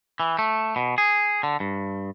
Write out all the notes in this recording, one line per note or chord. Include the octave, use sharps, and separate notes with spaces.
E3
A3
B2
G#4
D3
G2